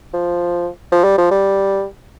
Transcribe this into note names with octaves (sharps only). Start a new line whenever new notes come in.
F3
F3
G3
F3
G3